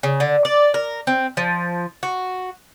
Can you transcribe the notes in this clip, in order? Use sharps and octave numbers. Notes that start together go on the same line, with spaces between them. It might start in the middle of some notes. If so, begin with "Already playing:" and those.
C#3
D3
D5
A#4
C4
F3
F#4